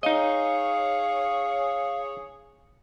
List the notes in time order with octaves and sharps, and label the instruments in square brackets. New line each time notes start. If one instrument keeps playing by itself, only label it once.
[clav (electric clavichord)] D#4 D#5 [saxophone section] G#4 C#5 [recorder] F5